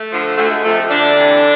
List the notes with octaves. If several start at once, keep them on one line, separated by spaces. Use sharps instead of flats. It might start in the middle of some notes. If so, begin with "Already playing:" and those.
Already playing: A3
D3 F3
D2 A3
G#3
C3 F3 A3
D2 D3 D4
C3 E3